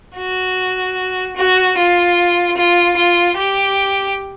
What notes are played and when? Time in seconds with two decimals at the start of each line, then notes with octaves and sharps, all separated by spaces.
0.17 F#4
1.36 F#4
1.77 F4
2.57 F4
2.96 F4
3.37 G4